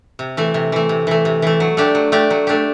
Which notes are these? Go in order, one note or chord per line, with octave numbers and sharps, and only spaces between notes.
C3
E3 A3
C3
E3 A3
C3
E3 A3
C3
E3 A3
F#3
A3 D4 G4
F#3
A3 D4 G4
F#3
A3 D4 G4